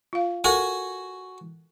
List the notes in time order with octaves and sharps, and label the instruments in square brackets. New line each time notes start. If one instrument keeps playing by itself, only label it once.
[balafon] F4 F5
[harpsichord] F#4 G#5 [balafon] A4 A#4